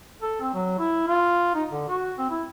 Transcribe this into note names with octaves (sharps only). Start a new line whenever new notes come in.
A4
C4
F#3
E4
F4
D#4
D3
F#4
C4
E4